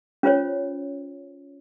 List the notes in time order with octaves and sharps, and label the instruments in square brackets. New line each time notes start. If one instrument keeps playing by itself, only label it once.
[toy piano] C#4 F4 C5 C#5